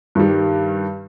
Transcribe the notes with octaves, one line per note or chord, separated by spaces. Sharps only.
G2 D#3 G3